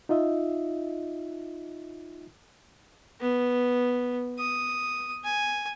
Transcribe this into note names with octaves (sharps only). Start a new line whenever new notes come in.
D#4 F4 D#5 E5
B3
D#6
G#5